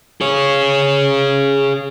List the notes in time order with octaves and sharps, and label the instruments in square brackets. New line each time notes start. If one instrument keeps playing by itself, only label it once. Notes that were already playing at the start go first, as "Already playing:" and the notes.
[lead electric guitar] G#4 C#5